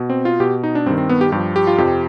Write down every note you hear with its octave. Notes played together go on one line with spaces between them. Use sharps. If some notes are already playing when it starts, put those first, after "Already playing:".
Already playing: B2
C4
F4
B2 G4
D#4
D4
G2 D#3 C4
C4
B3
G4
G2 F3 G4
G4
F4
F2 C3 F3 G4